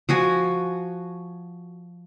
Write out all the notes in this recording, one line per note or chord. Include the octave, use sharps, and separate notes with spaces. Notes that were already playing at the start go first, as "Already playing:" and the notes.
F3 F#4 G#5